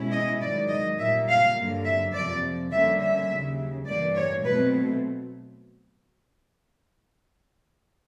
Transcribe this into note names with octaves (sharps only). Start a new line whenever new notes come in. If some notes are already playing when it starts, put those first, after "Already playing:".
Already playing: B2 G#3 C#4 E4
D#5
G#2 D#3 F#3 D5
D#5
A#2 G3 A#3 E5
F5
G2 D3 F#3 A#3
E5
F2 C3 F3 D5
D3 G3 A#3 C#4 E5
E5
D#2 C#3 F#3
G2 E3 G3 A#3 D5
C#5
B2 F#3 A3 C4 B4